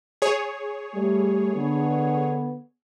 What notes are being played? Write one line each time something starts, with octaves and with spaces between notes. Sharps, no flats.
G#4 C#5
G3 A3
D3 B3